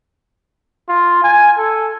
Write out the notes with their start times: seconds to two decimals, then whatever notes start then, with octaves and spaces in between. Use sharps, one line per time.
0.89 F4
1.23 G#5
1.57 A4